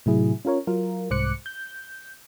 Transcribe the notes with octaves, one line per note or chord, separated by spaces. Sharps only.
A2 C3 F#3 E4 G#4
C#4 F4 A#4 C#5
F#3 F4 A#4
C2 G#2 C5 D6 F#6 C#7
G6